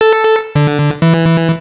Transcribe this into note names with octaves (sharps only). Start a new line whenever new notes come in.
A4
D3
E3